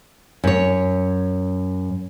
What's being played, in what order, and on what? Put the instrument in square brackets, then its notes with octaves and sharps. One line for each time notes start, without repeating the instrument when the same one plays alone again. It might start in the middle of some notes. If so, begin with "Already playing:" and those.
[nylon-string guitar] F#2 C#5